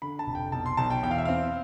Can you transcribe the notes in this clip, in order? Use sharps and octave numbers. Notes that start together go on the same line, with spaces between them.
D3 B5
A5
F1
G5
B1 A5
C6
B1 A5
G5
E2 G5
F5
E5
C4 F5